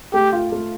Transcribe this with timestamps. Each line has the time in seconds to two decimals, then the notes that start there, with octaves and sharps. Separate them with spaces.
0.13 A3 G4
0.32 F4
0.52 A3